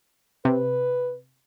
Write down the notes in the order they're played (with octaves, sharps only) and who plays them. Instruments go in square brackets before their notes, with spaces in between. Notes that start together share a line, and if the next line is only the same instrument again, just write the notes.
[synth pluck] C3 [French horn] B4